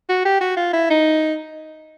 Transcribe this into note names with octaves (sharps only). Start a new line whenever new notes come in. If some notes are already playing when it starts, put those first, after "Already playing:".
F#4
G4
F#4
F4
E4
D#4